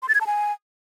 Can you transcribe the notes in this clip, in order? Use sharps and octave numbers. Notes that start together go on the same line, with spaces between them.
C6
A6
G#6
A5
G#5